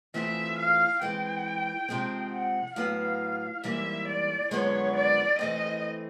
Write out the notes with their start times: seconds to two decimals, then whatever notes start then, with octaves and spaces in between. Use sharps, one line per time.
0.14 E3 A3 C4 F4 G#4 E5
0.58 F5
1.02 E3 G#3 C4 G5
1.89 C3 F3 G#3 C4
2.32 F#5
2.76 A2 F#3 B3 F5
3.63 G#2 E3 G3 A#3 E5
4.08 D5
4.51 F#2 D3 F3 G#3 B3 C#5
4.96 D5
5.38 E3 A3 C4 D#5